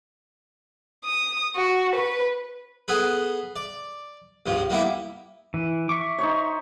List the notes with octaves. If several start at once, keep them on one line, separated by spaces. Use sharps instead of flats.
D#6
F#4
B4
B3 G#4 A4 B4
D5
C#2 G2 C3 F3
G3 A#3 B3 E4 G4
E3
E5 C#6 D6
D#4 C5 C#5